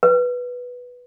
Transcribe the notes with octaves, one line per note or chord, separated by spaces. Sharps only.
B4